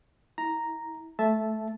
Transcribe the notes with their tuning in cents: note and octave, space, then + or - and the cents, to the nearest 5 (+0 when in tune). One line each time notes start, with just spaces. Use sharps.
E4 -25 A#5 +0
A3 -15 E5 +0 A5 -10